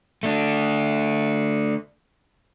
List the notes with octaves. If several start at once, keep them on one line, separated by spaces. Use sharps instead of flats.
A3 D4